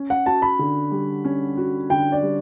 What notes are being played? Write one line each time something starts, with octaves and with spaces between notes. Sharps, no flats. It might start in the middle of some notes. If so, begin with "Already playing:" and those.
Already playing: C#4
F#5
F#4 A5
B5
D3
G3
C#4
F#4
D3 G5
D5
G3